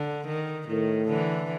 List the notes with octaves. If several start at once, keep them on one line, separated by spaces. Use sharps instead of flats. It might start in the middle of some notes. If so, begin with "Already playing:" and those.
Already playing: D3
D#3
A2 D#3
D3 E3